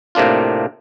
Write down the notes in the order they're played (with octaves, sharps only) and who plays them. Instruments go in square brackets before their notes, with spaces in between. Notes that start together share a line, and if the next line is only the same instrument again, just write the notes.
[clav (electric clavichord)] A2 C3 A#3 D4 F4